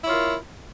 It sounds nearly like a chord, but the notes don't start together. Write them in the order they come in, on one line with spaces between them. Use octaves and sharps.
E4 C#5 F4 A#4